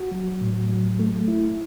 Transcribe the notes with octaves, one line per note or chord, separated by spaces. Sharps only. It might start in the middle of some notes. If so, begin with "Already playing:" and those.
Already playing: F#4
F#3
A2
F#3
A3
E4